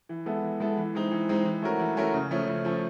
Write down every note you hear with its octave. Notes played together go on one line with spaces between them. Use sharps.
E3
G#3 B3 E4 A4
E3
G#3 B3 E4 A4
E3
G#3 C4 D#4
E3
G#3 C4 D#4
E3
A3 C#4 F#4 A#4
E3
A3 C#4 F#4 A#4
C#3
F3 A3 C#4
C#3
F3 A3 C#4